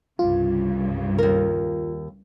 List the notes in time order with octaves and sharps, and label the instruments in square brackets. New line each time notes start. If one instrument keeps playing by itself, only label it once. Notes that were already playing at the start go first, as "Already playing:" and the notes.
[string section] C2 G2 C#3 [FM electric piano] F4
[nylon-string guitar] D#2 A#4